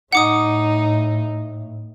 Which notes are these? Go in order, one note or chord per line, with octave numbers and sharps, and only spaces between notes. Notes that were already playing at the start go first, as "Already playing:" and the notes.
A2 D#4 F#5 D6 D#6